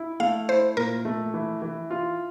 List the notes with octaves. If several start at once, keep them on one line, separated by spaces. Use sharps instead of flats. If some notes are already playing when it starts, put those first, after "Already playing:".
Already playing: E4
A3 F5
E4 C5
A#2 A#4
A3
E3
E3
F4